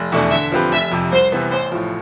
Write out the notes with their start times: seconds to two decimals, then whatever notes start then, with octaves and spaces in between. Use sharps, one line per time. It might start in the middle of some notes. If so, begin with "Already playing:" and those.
Already playing: F1
0.12 E2 B2 A3 D4
0.31 D3 E5
0.52 F3 C4 G4 B4
0.72 F1 E5
0.92 F2 C3
1.12 C2 C5
1.32 C3 E3 B3
1.52 A1 C5
1.72 A2 F3